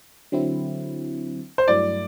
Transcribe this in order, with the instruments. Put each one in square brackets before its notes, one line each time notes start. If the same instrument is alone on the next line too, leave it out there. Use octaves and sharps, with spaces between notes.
[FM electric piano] D3 F#3 C4 E4
[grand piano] C5
[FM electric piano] G2 F#3 A3 E4 [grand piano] D5